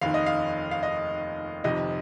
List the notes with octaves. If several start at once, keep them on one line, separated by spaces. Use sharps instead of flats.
F1 D#2 D#3 F5
D#5
F5
F5
D#5
F1 F2 C3 D#3 D#5